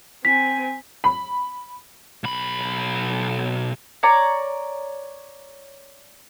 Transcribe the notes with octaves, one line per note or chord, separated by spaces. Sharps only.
C4 G#5 B6
B5
B1 B5
C#5 D5 A#5